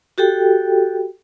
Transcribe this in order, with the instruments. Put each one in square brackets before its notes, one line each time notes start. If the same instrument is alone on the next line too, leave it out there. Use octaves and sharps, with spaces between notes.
[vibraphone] F#4 G4 A4 G5